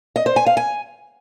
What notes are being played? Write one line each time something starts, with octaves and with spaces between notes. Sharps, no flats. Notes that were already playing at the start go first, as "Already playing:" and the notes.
D#5
C5
G#5
F5
G#5